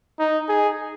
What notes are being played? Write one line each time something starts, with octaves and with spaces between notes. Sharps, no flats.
D#4
G#4